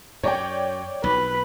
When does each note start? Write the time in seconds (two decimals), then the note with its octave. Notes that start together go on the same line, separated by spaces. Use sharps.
0.23 F#2 C#5 D5 G5
1.04 B1 B4